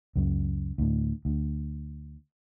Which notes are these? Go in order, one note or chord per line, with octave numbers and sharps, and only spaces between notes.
C#2 F#2
D2 A2
D2